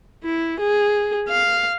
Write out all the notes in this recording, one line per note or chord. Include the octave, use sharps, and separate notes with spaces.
E4
G#4
F5